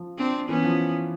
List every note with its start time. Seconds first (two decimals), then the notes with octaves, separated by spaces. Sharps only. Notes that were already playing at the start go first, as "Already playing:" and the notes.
Already playing: F3
0.18 C4 D4
0.49 E3 B3 C#4
0.64 F3